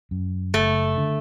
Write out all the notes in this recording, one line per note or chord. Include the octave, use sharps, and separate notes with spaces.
F#2
F#1 A3
D3